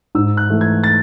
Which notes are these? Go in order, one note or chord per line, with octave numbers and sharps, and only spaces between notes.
G#2 E6
F#6
E3 A3
G#6
A6